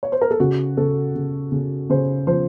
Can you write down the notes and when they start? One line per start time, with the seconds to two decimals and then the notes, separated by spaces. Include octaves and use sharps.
0.03 C#5
0.12 C5
0.21 A#4
0.31 A4
0.40 C#3 F#4
0.77 C#3 A4
1.15 C#3
1.52 C#3
1.90 C#3 C5
2.27 F3 C5